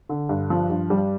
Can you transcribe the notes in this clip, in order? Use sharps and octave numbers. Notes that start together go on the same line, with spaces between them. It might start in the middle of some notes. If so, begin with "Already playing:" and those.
D3
G2
F3
G2
G3